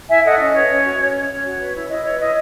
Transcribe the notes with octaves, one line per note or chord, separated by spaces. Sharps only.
E4 E5 G#5
A4 D#5 F#5
C#4 D#5
B4 C#5
C#4
F#4
C#4
C#5
C#4 C#5
F#4
B4
E4
E4 D#5
B4 C#5
E4 D#5